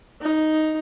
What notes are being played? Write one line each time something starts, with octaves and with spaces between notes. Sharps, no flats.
D#4